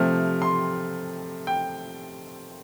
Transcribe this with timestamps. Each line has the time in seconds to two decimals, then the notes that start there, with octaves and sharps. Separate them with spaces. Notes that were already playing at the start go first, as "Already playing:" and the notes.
Already playing: C3 F3 A3 F6
0.42 C6
1.47 G5